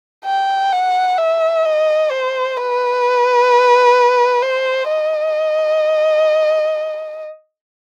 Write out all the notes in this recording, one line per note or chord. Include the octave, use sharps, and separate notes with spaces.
G5
F#5
E5
D#5
C5
B4
C5
D#5